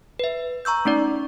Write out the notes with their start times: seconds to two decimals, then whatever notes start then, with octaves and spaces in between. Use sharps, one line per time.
0.19 B4 E5
0.65 A#5 C#6 E6 G6
0.85 A3 C#4 D#4 D5